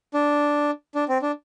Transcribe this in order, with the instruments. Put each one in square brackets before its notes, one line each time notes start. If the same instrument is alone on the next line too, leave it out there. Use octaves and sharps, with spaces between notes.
[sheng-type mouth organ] D4
D4
C4
D4